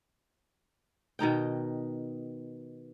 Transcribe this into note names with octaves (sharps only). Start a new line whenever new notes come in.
B2 D#3 D#4 G5